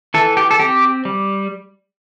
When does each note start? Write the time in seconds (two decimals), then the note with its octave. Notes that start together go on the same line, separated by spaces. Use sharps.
0.14 E3 A4
0.37 G4
0.51 A4
0.59 C4 G4
1.05 G3